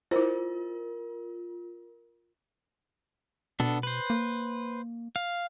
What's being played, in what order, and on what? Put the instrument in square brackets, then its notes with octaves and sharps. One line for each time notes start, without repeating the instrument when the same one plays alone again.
[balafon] E4 C5 [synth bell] F4 A#4
[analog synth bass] B2 [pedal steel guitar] B3 D4 A4
[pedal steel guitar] B4 C5
[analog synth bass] A#3
[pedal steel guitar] F5